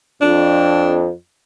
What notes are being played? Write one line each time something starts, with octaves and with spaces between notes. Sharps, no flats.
F2 D4